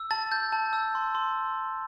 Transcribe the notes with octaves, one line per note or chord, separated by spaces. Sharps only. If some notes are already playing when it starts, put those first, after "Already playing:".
Already playing: E6
A5 A6
G6
A5
E6
C6
C6